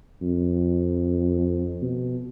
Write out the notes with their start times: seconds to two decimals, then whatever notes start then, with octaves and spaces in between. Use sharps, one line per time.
0.21 F2
1.82 B2